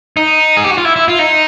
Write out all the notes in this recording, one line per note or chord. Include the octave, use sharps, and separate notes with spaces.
D#4
G#4
G4
F#4
F4
E4
E4
F4
D#4